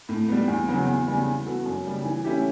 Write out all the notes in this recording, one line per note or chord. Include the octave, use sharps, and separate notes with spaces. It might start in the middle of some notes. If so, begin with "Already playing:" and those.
A2
G3 B3
E2
C#3 F#3 B3 F#4
E2
C#3 G3 B3
E3
B3 F#4 A4
F#2
C#3 G3
E3
A3 C#4 E4 G4